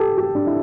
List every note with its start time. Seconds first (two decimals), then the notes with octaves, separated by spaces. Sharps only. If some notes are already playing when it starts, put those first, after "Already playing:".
Already playing: G4 A4
0.18 G4
0.35 D4
0.47 E4